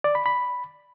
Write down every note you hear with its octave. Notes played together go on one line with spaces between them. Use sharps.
D5
B5
B5